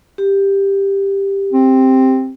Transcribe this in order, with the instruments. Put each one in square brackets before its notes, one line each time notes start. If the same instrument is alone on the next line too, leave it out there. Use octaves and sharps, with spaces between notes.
[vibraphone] G4
[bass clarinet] C4